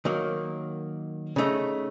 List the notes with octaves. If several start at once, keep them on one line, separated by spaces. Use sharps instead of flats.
D#3 F#3 A#3
C#3 A3 D#4